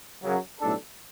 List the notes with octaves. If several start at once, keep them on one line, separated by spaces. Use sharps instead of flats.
F#2 C#3 F#3
B1 A2 G3 D4 A4